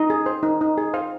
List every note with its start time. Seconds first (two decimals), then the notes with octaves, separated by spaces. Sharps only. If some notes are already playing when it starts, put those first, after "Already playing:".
Already playing: D#4 D#5
0.10 G#4
0.26 C5
0.43 D#4
0.61 D#4
0.78 G#4
0.94 C5 F5